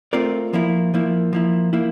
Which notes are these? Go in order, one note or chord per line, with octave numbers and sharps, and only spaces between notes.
A3 C4 F4 A#4 D5
F3 A#3 E4
F3 A#3 E4
F3 A#3 E4
F3 A#3 E4